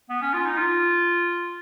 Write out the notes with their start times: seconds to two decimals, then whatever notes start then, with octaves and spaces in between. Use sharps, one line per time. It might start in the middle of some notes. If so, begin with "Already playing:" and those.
0.10 B3
0.22 C#4
0.34 F4
0.46 D#4
0.58 F4